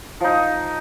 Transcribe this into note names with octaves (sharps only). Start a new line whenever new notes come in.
F3 D#4